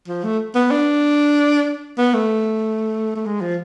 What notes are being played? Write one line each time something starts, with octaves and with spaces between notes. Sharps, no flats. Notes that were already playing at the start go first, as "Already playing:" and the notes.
F3
A3
B3
D4
B3
A3
A3
G#3
F3